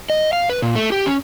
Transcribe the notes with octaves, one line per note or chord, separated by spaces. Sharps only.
D#5
F5
B4
A#2
A3
G4
C#4